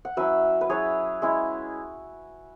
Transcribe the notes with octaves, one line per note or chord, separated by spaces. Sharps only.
F#5
F#3 C#4 E4 B4 E5
B4
F#3 C#4 E4 G#4 C#5
G#3 C#4 E4